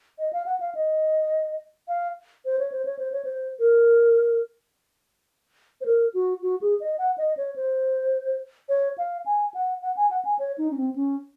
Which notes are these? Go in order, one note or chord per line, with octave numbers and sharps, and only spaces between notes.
D#5
F5
F#5
F5
D#5
F5
C5
C#5
C5
C#5
C5
C#5
C5
A#4
C5
A#4
F#4
F#4
G#4
D#5
F#5
D#5
C#5
C5
C#5
F5
G#5
F#5
F#5
G#5
F#5
G#5
C#5
D#4
C#4
C4
C#4